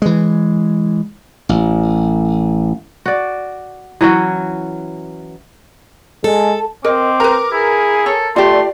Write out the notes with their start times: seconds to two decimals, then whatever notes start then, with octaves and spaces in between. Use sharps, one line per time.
0.02 E3 G#3
1.49 A1
3.06 F#4 D5
4.01 E3 F#3 C#4 F#4
6.24 G#3 A4
6.84 C4 A#4 D#5 D6
7.20 A#4 B4 A#5
7.52 E4 G#4
8.06 A4 C#5
8.36 A3 F4 G4 D5 C6